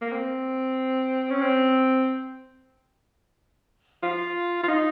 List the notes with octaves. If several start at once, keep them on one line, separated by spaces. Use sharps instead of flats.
A#3
C4
C#4
C4
F4
F4
D#4